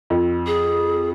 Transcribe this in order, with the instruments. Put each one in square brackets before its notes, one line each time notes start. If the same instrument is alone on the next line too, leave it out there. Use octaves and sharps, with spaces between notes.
[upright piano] F2
[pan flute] G#4